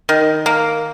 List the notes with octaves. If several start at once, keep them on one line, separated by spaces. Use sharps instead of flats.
D#3
A#3